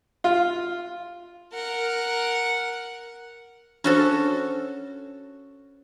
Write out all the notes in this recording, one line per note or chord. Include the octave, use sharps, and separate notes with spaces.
F4
A#4 F#5
C#4 D4 F#4 A4 C5